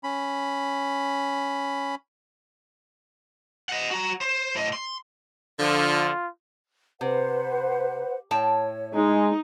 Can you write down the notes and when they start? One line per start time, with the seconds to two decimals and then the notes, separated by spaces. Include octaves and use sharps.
0.04 C#4 B5
3.69 D#5 F#5
3.91 F#4 A#5
4.21 C5
4.55 A2 D#5
4.73 C6
5.60 D3 F3 F4
7.01 C3 B4 C5 F#5
8.31 A2 C#5 G5 A5
8.94 G#3 D#4